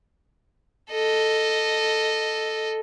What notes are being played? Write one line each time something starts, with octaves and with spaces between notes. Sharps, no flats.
A4 D#5